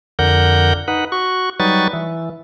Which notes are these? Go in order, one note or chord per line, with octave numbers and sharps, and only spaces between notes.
F2 D3 A#4 F#5 G6
D#4 B4 F#5
F#4 C#6
F#3 G3 D#4 B4 C#6 A6
E3